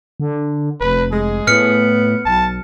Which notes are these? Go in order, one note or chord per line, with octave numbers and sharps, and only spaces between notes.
D3
F1 B4
G#3 G#4
A2 B3 F6 C#7
B1 A5